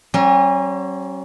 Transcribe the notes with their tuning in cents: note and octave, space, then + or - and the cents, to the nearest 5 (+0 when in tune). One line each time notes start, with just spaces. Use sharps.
F#3 +40 C#4 -35